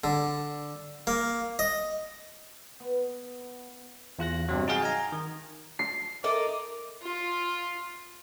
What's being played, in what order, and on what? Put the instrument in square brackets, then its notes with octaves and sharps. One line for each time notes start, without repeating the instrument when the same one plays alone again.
[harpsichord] D3
A#3
D#5
[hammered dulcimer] B3
[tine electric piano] E2 F4 F#6 A#6
G2 C3 F#3
D#4 F#4 G#4 F5 G5
G#5 A#5
D#3
[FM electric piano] A5 [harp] C7
[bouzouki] D#4 A4 [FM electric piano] A#4 E5 [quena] D6
[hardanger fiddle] F4